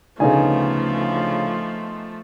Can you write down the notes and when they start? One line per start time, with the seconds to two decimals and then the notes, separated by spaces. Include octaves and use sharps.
0.20 D2 C#3 F3 A3 B3 D#4 G#5